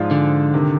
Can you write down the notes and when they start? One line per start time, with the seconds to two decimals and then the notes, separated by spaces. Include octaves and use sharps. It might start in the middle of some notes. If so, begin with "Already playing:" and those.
Already playing: G#2 F3 G#3 D4 F4
0.11 D3
0.53 C3 D#3